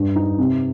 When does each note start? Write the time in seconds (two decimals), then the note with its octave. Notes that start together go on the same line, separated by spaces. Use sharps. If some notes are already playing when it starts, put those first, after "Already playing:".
Already playing: G2
0.16 D#4
0.38 C3